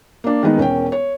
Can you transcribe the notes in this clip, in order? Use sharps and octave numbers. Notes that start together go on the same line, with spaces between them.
A#3 D4
D#3 G#3 B3 D#4
E1 C#4 A#4 G5
C#5